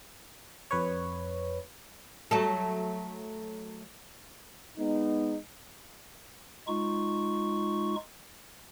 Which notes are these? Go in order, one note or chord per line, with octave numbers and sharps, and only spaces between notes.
F2 B4 C#5
F#3 A3 A4
G#3 B3 D#4
G#3 D#4 F4 C#6